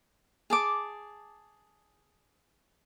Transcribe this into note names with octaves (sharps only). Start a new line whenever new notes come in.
G#4 A5 D6